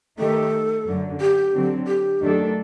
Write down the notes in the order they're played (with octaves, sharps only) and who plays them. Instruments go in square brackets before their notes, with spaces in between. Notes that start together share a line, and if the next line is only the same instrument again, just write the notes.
[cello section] D#3 A3 D#4 G4 [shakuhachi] A4
[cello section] F#2 D3 F#3
[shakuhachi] G4
[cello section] D3 F#3 C4
[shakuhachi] G4
[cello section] F#2 D#3 A3 D4 A4